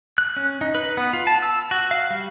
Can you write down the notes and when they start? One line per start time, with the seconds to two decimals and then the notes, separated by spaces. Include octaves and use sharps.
0.18 F#6
0.37 C#4
0.61 D#4
0.75 B4
0.97 B3
1.13 F4
1.27 A5
1.42 E6
1.71 F#4
1.91 F5
2.11 G3